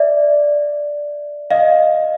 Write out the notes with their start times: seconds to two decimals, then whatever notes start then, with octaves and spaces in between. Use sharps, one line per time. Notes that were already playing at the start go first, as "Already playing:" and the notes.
Already playing: D5 E5
1.51 D#5 F5